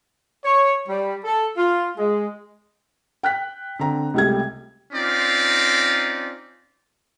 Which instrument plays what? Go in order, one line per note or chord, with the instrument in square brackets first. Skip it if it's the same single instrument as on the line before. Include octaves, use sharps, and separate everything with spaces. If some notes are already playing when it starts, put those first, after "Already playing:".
[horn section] C#5
G3
A4
F4
G#3
[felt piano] G5 F#6 B6
D3 C4 A#5
C#2 C3 G3 A3 G#6
[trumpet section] C4 C#4 D#4 F4 D5